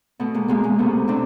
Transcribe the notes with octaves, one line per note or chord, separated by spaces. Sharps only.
B2 A3 B3
G#3 A#3
B2 G#3 A#3
G#3 A#3
C3 A3 B3
C3 C4 D4